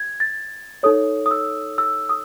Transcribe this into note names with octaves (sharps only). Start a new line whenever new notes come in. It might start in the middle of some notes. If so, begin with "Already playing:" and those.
Already playing: G#6
A6
D#4 A4 C#5 D#6
D#6
E6
E6
D#6